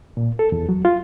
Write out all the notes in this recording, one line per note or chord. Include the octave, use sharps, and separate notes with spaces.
A#2
A4
E2
F#3
F4